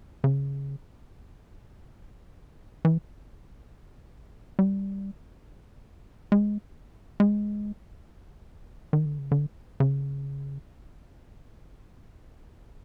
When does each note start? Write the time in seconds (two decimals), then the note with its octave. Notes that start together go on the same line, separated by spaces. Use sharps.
0.24 C#3
2.85 E3
4.59 G3
6.32 G#3
7.20 G#3
8.93 D#3
9.05 D3
9.19 C#3
9.32 D3
9.80 C#3